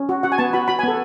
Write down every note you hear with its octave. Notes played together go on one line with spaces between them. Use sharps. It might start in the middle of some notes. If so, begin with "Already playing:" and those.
Already playing: C#4
F#4
F#4 F#5
G#5
B3 A5
F#4 B5
F#4 B5
G#5
B3 A4